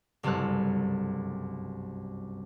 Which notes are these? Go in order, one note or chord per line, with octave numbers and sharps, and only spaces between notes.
F#1 C2 G2 A4 A#4 F#6